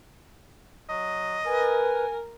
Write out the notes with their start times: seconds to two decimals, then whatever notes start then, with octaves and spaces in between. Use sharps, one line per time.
0.89 F#3 D#5
1.46 A#4 B4 G#5